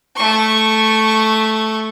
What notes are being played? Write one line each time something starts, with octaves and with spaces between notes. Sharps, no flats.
A3 C#6